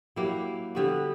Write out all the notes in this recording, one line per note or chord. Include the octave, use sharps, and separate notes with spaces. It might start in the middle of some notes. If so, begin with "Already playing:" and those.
F#3 A#3 E4 G4
D3 G3 B3 F#4